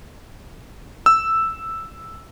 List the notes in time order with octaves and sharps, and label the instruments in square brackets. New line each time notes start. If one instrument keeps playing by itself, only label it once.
[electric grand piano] E6